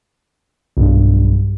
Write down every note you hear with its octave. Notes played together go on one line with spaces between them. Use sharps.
B1 G2